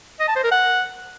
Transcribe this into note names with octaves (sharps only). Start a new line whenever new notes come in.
D#5
A5
C5
A#4
F#5